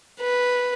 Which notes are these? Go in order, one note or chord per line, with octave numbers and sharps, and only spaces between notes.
B4